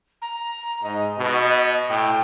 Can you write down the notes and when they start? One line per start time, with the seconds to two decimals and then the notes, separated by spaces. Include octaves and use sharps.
0.22 A#5
0.84 G#2 D#5
1.18 B2
1.89 A2 G5